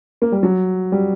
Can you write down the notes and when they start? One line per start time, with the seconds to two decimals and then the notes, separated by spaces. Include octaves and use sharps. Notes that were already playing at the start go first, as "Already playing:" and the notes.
0.22 A#3
0.32 G3
0.43 F#3
0.92 G3